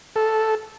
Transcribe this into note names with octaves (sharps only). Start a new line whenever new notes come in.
A4